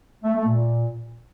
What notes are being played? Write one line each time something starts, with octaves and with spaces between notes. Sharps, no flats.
A3
A3
A#2